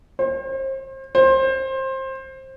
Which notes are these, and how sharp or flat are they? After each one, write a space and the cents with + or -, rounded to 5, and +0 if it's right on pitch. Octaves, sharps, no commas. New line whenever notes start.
C5 +35
C5 +20